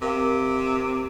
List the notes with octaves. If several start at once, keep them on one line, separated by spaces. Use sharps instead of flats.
C3 A#4 F5 G5